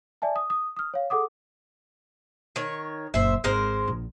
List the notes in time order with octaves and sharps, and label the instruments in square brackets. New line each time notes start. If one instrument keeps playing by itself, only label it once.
[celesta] D5 E5 G#5 A5
D#6
D#6
D#6 F6
C#5 F5
G#4 A4 F#5 D6 D#6
[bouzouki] D#3 C#5
[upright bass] F#1 A#2 [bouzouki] C5 E5
[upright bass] G#1 [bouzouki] G#3 A#4 C5
[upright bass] A#1